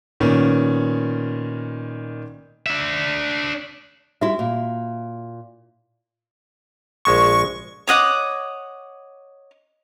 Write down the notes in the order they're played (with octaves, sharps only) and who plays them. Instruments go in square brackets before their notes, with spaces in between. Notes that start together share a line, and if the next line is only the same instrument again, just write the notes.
[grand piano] A#2 D#3 B3 C#4
[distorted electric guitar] D4 E5
[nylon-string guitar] G3 E4 [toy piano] F#4 E5
[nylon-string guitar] A#2
[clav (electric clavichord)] A#1 G#3 A5 [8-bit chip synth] C#6
[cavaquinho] C#5 D#5 F#5 D6